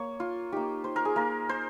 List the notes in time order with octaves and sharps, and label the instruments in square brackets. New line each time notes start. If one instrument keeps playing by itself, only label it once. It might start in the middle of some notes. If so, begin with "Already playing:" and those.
Already playing: [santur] A#3 C#5
F4
A#3 D#4 G4
C5
A#4
G#4
A#3 F4 A#4
C5